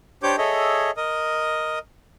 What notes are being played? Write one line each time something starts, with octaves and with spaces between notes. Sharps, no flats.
D4 G4 C5 C#5 D6 G6
G#4 A4 C#5 D#5 E5
A#4 D#5 D#6